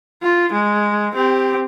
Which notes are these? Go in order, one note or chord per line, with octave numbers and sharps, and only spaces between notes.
F4
G#3
C4 G4